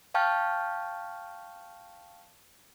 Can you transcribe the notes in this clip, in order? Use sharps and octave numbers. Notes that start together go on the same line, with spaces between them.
F5 G5 A5 C#6 F6 G6